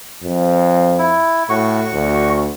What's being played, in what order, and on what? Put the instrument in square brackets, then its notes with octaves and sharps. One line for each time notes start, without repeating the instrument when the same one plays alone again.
[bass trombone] F2
[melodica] E4
[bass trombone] A2 [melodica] F#4 C#6
[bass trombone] D2